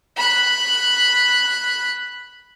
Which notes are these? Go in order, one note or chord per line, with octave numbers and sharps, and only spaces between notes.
B5 F#6